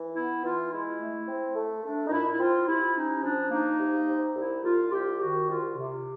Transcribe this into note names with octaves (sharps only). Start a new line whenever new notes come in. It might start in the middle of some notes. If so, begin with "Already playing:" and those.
Already playing: E3
B3 E4
E3 F4
G#3 E4
A3
C4
A3
A3 D4
D#4
A#2 E4
E4
C4 F4
C3 E4
C#4 D#4
F3 D4
A#3 D#4
C3
C3
C2 E4
C2 F4
C2 G4
D#3 F#4
C2 F4
C3